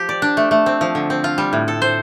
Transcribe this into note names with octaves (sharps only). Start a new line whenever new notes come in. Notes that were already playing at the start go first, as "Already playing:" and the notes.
Already playing: F3 G4
D5
D4
A3
A3
C4
F3
D3
C4
F4
G3
A2
A4
C5